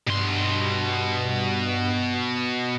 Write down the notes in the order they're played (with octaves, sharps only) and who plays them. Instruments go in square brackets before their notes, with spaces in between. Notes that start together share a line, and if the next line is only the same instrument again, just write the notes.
[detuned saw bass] G2 [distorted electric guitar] B2 C6